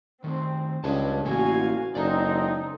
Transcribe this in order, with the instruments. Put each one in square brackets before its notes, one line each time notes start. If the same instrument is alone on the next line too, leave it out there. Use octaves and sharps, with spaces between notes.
[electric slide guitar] D#3 A3 [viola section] C4
[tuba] C#2 [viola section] G3 G#3 [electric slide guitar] D4 B4 A5
[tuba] A1 [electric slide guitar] A#3 B3 E4 [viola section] F#4 F5 G#5
[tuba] F#1 [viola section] G#3 C4 D#4 [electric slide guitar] A4 D5